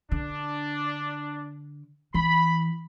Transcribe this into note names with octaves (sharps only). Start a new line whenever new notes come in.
D3 D4
E3 B5